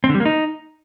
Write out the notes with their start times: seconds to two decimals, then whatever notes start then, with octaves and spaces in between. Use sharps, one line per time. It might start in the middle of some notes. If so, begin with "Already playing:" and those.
0.04 C4
0.09 D3
0.15 G3
0.20 A#3
0.25 D#4